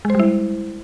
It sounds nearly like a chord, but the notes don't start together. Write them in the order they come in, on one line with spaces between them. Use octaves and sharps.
G#3 C5 G3 E4